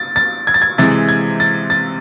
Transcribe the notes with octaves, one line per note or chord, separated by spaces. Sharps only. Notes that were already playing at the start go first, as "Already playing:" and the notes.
Already playing: A6
A6
G#6
A6
G#6
C3 E3 G#3 A6
G#6
A6
A6